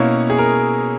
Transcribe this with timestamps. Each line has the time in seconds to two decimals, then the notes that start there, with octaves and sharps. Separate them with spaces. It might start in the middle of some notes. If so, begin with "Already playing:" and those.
Already playing: B2 A#3 C#4 E4 C#5
0.30 G#4
0.38 A#4